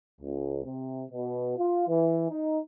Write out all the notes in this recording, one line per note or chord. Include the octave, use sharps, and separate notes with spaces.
C#2
C3
B2
F4
E3
D#4